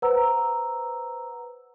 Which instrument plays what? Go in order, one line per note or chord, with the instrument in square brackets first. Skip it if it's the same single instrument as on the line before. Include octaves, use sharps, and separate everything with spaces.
[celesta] B4 C5 F#5 A#5 E6